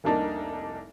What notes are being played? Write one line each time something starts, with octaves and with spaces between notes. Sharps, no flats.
F1 C2 A#3 D4 D#4